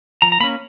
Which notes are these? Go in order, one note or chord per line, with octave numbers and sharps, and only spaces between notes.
F3 A#5
A#5
A#3 C#4 B5